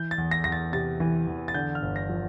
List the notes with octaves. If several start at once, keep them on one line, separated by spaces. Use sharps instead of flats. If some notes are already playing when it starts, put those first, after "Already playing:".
Already playing: E3 G6
A6
E2
A#6
E2 A#6
A6
C3 A6
E3
E2
A6
D3 G6
F6
G1
A#6
F3